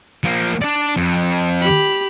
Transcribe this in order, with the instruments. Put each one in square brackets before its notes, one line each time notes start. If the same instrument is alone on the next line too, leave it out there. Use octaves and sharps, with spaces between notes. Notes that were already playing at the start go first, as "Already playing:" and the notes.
[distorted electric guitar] F3 A#3
D4 D5
F2
[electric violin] G4 B5